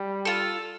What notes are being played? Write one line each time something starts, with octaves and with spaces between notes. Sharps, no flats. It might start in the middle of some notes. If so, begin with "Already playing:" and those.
Already playing: G3
F4 A4